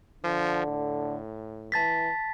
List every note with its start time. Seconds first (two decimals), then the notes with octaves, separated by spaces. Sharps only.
0.24 D3 F3
0.67 A2
1.72 E3 A5 A6 B6